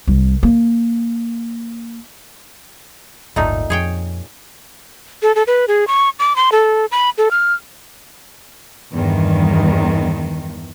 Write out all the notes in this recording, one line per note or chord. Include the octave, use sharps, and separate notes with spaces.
C2
A#3
D1 G1 A#2 A3 D#4
F2 G#4 C#5 G5
A4
A4
B4
G#4
C#6
D6
C6
A4
B5
A4
F6
E2 G2 D#3